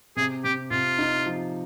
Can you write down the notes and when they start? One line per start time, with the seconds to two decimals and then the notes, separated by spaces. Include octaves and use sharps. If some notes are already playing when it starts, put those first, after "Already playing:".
0.17 C3 G#4
0.44 C3 G4
0.71 C3 F4
0.98 D#4
1.26 F3